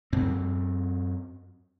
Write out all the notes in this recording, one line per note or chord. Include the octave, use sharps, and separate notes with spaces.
F#2 C4